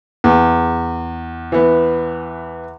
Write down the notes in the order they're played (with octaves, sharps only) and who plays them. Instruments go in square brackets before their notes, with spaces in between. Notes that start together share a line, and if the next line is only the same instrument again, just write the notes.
[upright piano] E2
[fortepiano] E3 B3